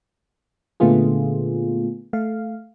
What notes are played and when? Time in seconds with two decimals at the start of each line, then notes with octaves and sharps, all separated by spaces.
0.80 A#2 D3 A3 B3 F4 G#4
2.13 A3 F5